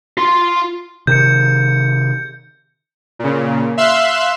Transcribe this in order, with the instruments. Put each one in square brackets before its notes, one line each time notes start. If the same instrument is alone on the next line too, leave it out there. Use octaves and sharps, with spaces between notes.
[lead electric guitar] F4 C6
[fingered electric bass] C3 D#3 [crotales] G6 C#7
[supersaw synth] A#2 C#3
E5 F5 C6 E6 F#6